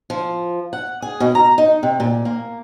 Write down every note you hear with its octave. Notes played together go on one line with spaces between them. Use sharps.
F3
F#5
G#4
B2
A#5
D#4
C3
A#2
A#3